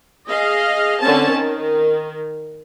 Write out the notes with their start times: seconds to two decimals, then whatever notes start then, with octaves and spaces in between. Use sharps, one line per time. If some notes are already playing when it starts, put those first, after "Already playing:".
0.28 G#4 D#5 F5
1.01 D3 C4 C#4 A5
1.31 D#3